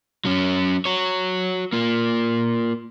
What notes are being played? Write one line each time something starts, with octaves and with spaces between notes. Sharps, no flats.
F#3 C#4
F#4 C#5
A#3 F4